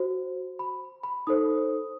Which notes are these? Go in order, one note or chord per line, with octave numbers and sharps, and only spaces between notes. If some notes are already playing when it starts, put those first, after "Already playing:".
Already playing: F#4 C5
B5
B5
D#4 A4 C5 D#6